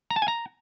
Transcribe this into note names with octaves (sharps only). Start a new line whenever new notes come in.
A#5
A5
G#5
A#5